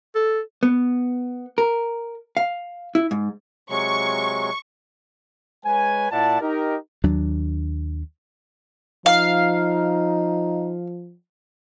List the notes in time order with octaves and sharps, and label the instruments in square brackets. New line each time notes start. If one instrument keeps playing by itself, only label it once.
[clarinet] A4
[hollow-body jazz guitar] B3
A#4
F5
E4
G#2
[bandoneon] C3 F#3 G#3 [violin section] C#6
[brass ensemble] G#3 B4 C#5 G#5
A#2 E4 D5 F#5 A5
D#4 G4 A#4
[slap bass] D#2 F#3 D4
[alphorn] F3 [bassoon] D#4 [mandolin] F5